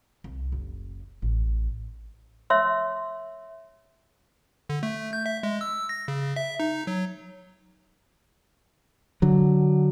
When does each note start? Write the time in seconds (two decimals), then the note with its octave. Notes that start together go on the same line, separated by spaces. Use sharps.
0.24 C2
0.52 F#1
1.22 A1
2.50 C#5 E5 C6 E6
4.70 D3
4.83 A3
5.13 G6
5.26 E5
5.43 G#3
5.61 E6
5.89 A#6
6.08 C#3
6.36 E5
6.60 D#4
6.87 F#3
9.22 D3 F#3